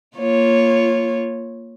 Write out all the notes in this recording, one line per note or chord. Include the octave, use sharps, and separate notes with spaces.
A#3 F4 C#5